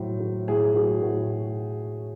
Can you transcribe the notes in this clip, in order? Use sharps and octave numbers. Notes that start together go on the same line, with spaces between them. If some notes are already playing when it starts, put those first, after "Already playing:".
Already playing: A2 F#3 C5
F#3
A2 G#4
F#3 F#4
A2 F#4